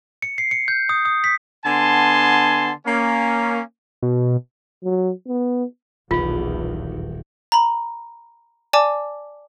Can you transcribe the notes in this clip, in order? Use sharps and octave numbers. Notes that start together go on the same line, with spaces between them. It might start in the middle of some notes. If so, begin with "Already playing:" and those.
C#7
C7
C#7
G6
D#6
D#6
B6
D3 B3 G#5 A5 C6
A#3 C#4
B2
F#3
B3
D#1 B1 E2 D#3 F4
A#5 B5
D5 G#5 A5 D6